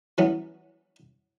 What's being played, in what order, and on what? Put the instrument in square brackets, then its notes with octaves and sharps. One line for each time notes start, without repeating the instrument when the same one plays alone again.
[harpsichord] E3 F#3 B3 C#4